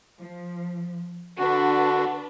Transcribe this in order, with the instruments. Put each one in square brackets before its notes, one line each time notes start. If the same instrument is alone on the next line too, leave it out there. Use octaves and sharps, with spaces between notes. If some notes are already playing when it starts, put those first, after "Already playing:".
[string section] F3
[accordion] D3 F#4 [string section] D4 B4